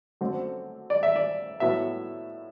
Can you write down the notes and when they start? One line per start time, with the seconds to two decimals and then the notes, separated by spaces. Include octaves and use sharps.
0.21 F#2 D3 A3 C4
0.90 D5
1.03 E5
1.16 D5
1.60 A2 F#3 B3 E5